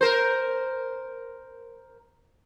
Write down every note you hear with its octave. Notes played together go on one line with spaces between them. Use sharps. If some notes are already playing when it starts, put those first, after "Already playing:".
A#4 C5